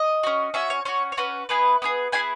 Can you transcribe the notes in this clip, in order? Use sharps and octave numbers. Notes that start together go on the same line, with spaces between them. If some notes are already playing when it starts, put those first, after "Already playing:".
Already playing: D#5
C#4 F#4
C#4 F#4 E5
C#5
C#4 F#4 C#5
C#5
C#4 F#4 B4
B3 E4 G#4 B4
B3 E4 G#4
B3 E4 G#4 G#5